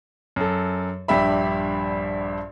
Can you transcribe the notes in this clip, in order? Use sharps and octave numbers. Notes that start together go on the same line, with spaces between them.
F#2 A4
A#1 G2 G4 E5 B5